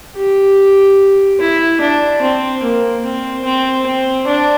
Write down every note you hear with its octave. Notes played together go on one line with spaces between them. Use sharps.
G4
E4
D4
C4
A#3
C4
C4
C4
D4